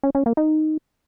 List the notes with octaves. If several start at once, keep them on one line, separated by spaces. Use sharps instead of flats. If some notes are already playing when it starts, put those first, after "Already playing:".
C#4
C#4
A#3
D#4